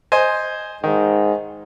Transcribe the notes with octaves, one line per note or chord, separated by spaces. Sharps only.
C5 D#5 G#5
G#2 D#3